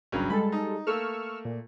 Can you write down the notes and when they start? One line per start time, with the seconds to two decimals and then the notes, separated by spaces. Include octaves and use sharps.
0.12 G#1 C#2 G2 C#3 F#3
0.30 G3 G#3 A4 B5
0.52 D#4
0.87 A3 A#3 C#6 E6 F6
1.45 A#2